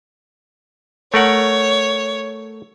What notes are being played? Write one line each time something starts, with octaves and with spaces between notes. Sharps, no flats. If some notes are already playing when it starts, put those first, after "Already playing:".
A3 A#4 C#5 F#5